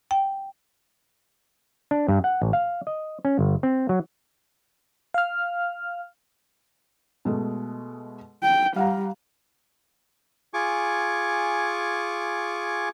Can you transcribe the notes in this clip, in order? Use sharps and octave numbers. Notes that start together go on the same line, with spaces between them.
G5
D4
G2
F#5
A1
F5
D#5
C#4
G1
C4
F#3
F5 F6
B2 G#3 A3
G5
G3 F5 F#5 A#5
F4 G#4 G#5 C#6 D6